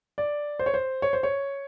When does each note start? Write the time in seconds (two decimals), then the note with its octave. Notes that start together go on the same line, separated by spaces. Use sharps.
0.18 D5
0.59 C5
0.66 C#5
0.74 C5
1.02 C#5
1.13 C5
1.23 C#5